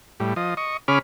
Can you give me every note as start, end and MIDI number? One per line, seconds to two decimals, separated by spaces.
0.20 0.34 45
0.20 0.34 55
0.36 0.54 53
0.36 0.54 75
0.57 0.77 75
0.57 0.77 85
0.88 0.99 49
0.88 0.99 61
0.88 0.99 68
0.88 0.99 83
0.88 0.99 86
0.88 0.99 89